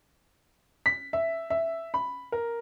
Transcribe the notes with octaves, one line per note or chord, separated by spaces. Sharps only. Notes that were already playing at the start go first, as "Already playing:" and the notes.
B6
E5
E5
B5
A#4